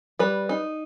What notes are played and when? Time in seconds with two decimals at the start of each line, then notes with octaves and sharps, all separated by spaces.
0.19 G3 B4
0.49 D#4